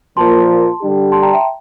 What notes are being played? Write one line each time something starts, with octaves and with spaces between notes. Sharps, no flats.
A#2 F3 A#3 F4 A5 C6
D3 G3 D4 G4
A5 C6
G5 A#5
E5 G5